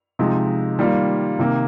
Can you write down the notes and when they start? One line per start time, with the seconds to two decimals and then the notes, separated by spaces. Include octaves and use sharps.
0.19 C3 F3 G#3 D#4
0.79 D#3 G3 A#3 F4
1.39 C3 D#3 A#3